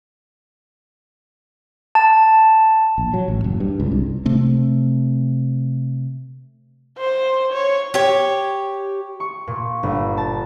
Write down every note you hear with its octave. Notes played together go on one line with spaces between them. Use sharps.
A5
A#1
F#3
A1
F#1
G2
C#2
C2
C3 A3 C4
C5
C#5
G4 C#5
C#6
A#2
G1
A5